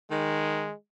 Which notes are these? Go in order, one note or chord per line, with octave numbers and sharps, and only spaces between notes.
D#3 G#3